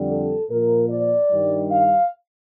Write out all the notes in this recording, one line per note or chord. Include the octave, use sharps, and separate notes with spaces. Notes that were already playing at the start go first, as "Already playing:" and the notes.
Already playing: F2 D3 G3
A4
A#2 F3 A#4
D5
G2 D#3 G3
F5